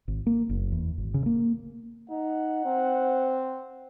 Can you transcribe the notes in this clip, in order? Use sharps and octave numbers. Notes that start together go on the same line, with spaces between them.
G#1
A#3
F#1
E2
G#1
C#3
A#3
D#4 F#5
C4